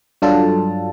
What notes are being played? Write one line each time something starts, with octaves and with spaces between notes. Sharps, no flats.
G2 F#3 D4 F4 A4 A5